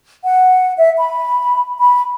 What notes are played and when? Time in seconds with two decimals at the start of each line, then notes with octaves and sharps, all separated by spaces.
0.24 F#5
0.78 E5
0.98 B5
1.79 B5